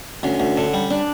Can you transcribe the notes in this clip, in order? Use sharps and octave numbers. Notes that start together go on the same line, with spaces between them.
D2 C#4
D2
D3
G3
D4